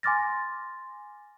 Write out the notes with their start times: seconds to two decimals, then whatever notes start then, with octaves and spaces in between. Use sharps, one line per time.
0.03 G#5 C6 D6 F6 A6 A#6